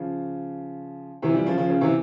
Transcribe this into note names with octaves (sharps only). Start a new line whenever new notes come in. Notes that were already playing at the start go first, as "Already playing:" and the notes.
Already playing: C#3 F3
C3 E3
E3 G3
C#3 F3
C#3 F3
C#3
C3 E3